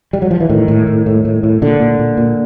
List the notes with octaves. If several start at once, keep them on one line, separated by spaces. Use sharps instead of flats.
G3
F#3
F3
E3
A2 D#3
A2
A2
A2
A2
A2
A#2 D3
A#2
A#2
A#2